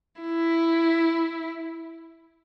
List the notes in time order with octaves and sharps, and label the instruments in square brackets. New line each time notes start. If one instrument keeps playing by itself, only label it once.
[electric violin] E4